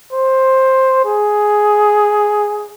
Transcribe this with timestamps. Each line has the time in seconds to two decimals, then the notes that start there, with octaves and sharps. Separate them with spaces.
0.13 C5
1.05 G#4